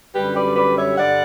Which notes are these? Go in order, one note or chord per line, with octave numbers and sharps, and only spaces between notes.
F#2 D3 G3 G4 B4
B4 D5
B4 D5
C#5 E5
G2 D3 G3 D5 F#5